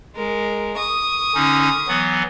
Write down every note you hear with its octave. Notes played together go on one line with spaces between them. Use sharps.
G#3 A#4
C#6 D#6
D3 C#4 D#4
E3 F#3 B3